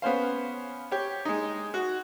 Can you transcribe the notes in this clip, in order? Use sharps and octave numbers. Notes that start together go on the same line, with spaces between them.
B3 C#4 C5 F5
G4 C#5
G#3 D#4
F#4